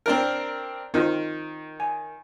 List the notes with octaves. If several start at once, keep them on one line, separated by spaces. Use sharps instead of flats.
C4 D4 A#4
D#3 C4 D#4 F4
G#5